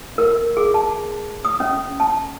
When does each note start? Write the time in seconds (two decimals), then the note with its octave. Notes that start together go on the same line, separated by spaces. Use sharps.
0.18 A#4
0.57 G#4
0.74 A5
1.45 D#6
1.60 C#4
2.00 A5